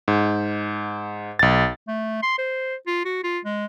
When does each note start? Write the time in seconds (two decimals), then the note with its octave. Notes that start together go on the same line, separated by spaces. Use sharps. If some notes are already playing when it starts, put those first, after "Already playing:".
0.08 G#2
1.39 B1 A6
1.88 A3
2.23 C6
2.38 C5
2.87 F4
3.05 F#4
3.24 F4
3.45 G#3